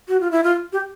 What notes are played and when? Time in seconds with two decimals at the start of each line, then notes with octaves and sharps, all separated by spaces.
0.08 F#4
0.20 F4
0.31 E4
0.44 F4
0.73 G4